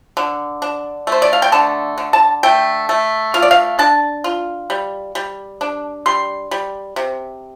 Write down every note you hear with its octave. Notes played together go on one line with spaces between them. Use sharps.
D3
D4
A3 C5
D5
F5
G5
D3 A5
D3
A5
A3 G5
A3
F4 F5
D5
F5
D4 A5
F4
G3
G3
D4
G3 C6
G3
C3